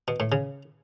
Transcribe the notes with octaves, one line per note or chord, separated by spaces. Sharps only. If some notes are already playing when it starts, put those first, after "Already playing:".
B2
A2
C#3